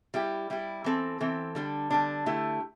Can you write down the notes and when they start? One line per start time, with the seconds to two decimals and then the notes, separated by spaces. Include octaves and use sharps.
0.14 G3 E4 G4
0.50 G3 E4 G4
0.84 E3 C4 A4
1.20 E3 C4 A4
1.55 D3 G3 D4
1.90 D3 G3 D4
2.26 D3 A3 E4 G4